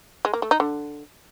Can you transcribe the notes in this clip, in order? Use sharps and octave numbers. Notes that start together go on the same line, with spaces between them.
G#3
A#3
A3
D#4
D3